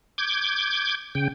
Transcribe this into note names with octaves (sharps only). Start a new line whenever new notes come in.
D6 G6 G#6
C#3 G5